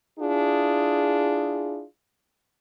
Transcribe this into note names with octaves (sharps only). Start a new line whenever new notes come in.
D4 E4 F4 G#4